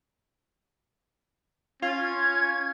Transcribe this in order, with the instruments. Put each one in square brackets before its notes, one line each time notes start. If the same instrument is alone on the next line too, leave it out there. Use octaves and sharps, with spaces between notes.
[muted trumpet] C#4 [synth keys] F4 [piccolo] G#6